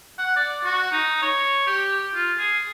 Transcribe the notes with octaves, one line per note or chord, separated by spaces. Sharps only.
F#5
D5
F#4
D#4
C#5
G4
F4
G#4